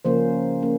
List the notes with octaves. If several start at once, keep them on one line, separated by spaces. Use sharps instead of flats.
C#3 F3 A#3 C#4 C5
A#3 C#4